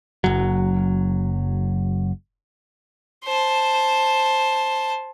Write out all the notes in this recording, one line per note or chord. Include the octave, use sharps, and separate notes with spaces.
F#1 F#3
C5 A5